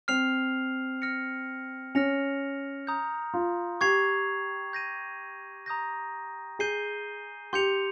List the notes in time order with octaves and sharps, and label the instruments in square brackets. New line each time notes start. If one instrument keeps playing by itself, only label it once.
[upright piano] C4 [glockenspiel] F6 C7 F7
[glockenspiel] F6 A#6 C#7
[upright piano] C#4 [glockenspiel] F6 A#6 C#7 F7
[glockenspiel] A#5 D#6 G6
[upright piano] F4
[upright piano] G4 [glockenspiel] C#6 G#6 C7 F7
[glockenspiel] G6 A#6 D#7
A#5 D#6 G6 A#6
[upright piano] G#4 [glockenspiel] G6 C7 D#7 G7
[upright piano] G4 [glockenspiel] C6 G6 C#7 F7